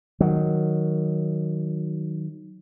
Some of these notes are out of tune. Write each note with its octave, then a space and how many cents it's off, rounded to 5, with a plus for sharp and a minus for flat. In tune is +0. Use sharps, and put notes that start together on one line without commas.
D#3 +0 F#3 +0